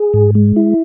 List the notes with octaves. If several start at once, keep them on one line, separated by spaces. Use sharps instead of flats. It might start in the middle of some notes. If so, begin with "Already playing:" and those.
Already playing: G#4
G#2
G#3
E4